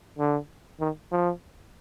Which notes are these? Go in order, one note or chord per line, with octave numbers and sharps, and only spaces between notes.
D3
D#3
F3